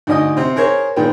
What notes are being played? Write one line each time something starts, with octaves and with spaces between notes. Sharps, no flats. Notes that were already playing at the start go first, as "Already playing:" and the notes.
D2 G#2 D#5 D#6
C3 C4
G#4 A#4 C5 C#5
A#2 D#3 G#3 B3 G5